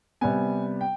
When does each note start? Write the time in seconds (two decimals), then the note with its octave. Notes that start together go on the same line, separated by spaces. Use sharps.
0.21 C3 G3 B3 G#5
0.81 G5